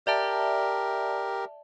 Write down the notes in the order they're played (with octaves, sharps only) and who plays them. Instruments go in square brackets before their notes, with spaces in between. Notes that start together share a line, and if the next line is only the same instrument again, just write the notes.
[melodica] G4 A#4 [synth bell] D5 E5 A5